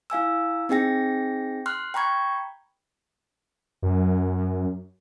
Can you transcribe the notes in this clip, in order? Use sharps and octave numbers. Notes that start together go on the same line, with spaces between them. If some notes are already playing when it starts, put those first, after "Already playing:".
E4 F5 G#5 E6
C4 D#4 G#4 G5 A#6
C6 F6 F#6
G5 A#5 B5 C#6 G#6
F#2